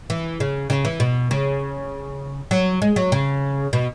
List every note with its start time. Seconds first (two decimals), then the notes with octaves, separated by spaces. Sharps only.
0.10 E3
0.40 C#3
0.70 C#3
0.85 E3
1.00 B2
1.31 C#3
2.51 F#3
2.82 G#3
2.96 F#3
3.12 C#3
3.73 B2